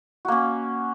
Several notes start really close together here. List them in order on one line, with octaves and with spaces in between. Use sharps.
F#4 A#3 C#4